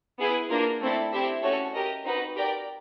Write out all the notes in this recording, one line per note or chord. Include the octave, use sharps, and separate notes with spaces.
B3 E4 G#4
A#3 D4 F4 A#4
A3 C4 E4 A4 D5
C4 E4 G4 C5 E5
A3 C#4 F#4 A4 C#5
G4 A#4 D#5
C4 D#4 F#4 B4
G4 A#4 D5 G5